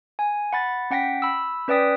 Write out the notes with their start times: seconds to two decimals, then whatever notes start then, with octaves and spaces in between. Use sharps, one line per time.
0.19 G#5
0.53 F#5 B5 A6
0.91 C#4 F#5 G5 A#6 B6
1.22 B5 E6
1.68 C#4 B4 D5 G5 D#6 B6